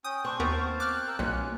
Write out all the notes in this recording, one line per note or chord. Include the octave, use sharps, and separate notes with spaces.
C#4 G5 D#6
C4 D4 C#6
D#2 B3 A#4 C5 F5 A5
D6 F6 F#6
A#4 G5 E6
B1 A#3 C#4 F4